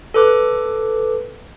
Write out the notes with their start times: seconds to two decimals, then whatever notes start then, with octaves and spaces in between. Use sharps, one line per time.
0.14 A4 B4 D6 F#6